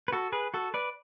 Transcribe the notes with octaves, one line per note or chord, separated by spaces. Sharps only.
B4
F#4 A4
G#4 B4
F#4 A4
B4 D5